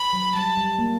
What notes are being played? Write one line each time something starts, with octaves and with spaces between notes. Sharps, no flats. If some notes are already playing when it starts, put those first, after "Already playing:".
Already playing: B5
F#3
G3 A5
G3
A#3